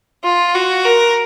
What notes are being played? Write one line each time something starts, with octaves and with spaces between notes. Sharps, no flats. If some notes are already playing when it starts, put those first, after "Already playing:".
F4
F#4
A#4